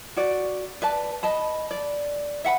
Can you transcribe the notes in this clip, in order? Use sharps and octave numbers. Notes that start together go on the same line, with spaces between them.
F#4 D5
B4 D5 A5
D#5 A5 B5
D5
E5 F#5 A5 B5